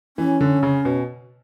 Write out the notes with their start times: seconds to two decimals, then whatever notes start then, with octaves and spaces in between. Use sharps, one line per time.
0.17 E3 C#4
0.41 D3
0.63 C#3
0.85 B2